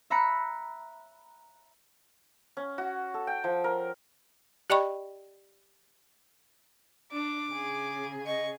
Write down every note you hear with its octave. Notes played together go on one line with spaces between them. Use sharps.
E5 A#5 B5 F#6 C#7
C#4
F#4
A4
G5
F3
A#4
G4 D5 D#5 G5 B5 C#6
D4 D6
C#3 G#4
D#5 C#6